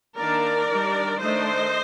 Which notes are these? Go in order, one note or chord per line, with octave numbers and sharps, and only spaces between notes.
D#3 A#3 D4 A#4 D5
D#3 G3 D4
D#3 A3 D4 C5 D#5